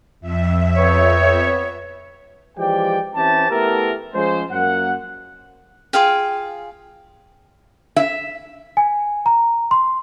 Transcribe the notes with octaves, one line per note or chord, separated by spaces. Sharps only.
F2 E5
B3 C4 C#5
E3 F3 G#3 G4 D5 G5
E3 C4 C#4 E4 G4 A5
A3 B3 E4 G4 A4 A#4
F3 G#3 C#4 G#4 C5
F#2 A#3 F#5
F4 G#4 F5 G5
E5
G#5
A#5
C6